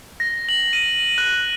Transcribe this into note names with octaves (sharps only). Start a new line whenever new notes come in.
A#6
F#7
D#7
F#6